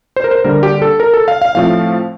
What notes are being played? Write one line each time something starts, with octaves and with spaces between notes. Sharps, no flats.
C5
A#4
C5
D3 G3 A#3 A#4
G4
A4
A#4
A4
F5
F5
A2 F3 A3 C4 F5